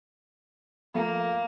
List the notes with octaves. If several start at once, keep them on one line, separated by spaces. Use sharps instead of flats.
F3 A3 A#3 A4